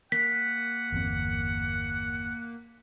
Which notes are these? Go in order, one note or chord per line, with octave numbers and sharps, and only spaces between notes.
A#3 F#5 B6
G1 E2 C4